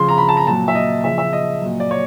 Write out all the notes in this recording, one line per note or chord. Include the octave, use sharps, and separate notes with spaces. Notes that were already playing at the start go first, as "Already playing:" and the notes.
Already playing: C#3 F3 C6
A#5
B5
A5
A#5
A#2 F#3 A5
E5
D#5
C#3 F3 E5
E5
D#5
A#2 F#3
D5
C#5